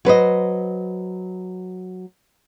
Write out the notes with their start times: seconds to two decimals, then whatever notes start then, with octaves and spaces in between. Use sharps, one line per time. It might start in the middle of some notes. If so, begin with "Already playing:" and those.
0.05 F#3 B4 C5 D#5